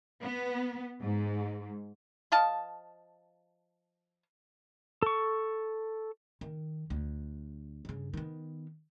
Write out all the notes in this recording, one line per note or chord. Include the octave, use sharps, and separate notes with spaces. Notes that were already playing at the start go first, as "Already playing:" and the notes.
B3
G#2
F3 D#5 F5 A5
A4 C#6
D#3
D2
G2 C#3
D#3 B3